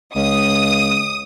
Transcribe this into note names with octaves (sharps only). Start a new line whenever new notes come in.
C#2 D#6